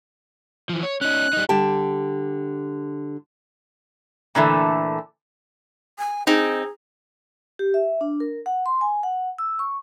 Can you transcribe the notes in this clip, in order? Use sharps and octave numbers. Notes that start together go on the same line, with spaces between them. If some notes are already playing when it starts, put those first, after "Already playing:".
E3 F3
C#5
C#4 D#4 F#6
G3 D#4
D3 G3 G4 G5 A5
A#2 D3 E3 A3
G#5
C4 D#4 G#4
G4
E5
D4
A#4
F#5
C6
G#5
F#5
E6
C#6